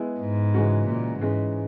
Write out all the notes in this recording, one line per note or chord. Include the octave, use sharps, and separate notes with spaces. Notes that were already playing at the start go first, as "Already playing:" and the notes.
Already playing: G#3 B3 E4 G#4
G#2
C#3 E3 G#3 C#4 F#4
A#2
G#2 E3 G#3 C#4